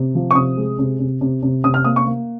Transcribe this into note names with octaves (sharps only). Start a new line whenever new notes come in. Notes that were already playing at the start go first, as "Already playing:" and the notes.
Already playing: C3
F3
C#6
C3 D#6
G#3
C3
C3
C3
C3
C3 D#6
F6
A#3 D#6
C#6
A#3